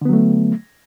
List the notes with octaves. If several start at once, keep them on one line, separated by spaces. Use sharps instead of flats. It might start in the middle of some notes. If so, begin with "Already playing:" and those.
D3 F#3 A3 B3